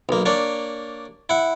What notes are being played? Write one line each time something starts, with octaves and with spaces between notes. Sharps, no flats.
B1 A#3
A#3 D4 C#5
E4 F#5